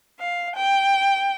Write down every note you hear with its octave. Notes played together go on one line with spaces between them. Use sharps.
F5
G5